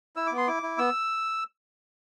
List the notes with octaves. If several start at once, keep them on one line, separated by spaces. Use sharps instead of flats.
E4 E6
D6
B3
C6
E4 D6
E4
B3 E6